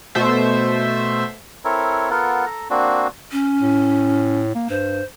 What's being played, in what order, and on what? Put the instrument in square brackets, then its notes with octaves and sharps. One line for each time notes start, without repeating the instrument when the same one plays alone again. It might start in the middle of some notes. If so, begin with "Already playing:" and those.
[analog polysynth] B2 A3 C5 E5
[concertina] C4 E4 A4 A#4 C#5
B3 F4 A4 A#4 F#5
A4 A#5
A#3 C4 D4 F#4
[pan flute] C#4
[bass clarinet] A2
A#3
[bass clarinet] G2 [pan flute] C5